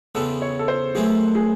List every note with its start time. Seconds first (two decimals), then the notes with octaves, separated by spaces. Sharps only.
0.15 E2 C#3 E3 C4 A4
0.42 C#5
0.59 A4
0.68 C5
0.95 F#2 E3 A3 C4 G#4
1.35 G#4